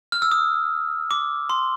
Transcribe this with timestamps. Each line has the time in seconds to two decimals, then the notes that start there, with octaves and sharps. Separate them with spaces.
0.12 F6
0.22 E6
0.32 D#6
1.11 D6
1.50 C6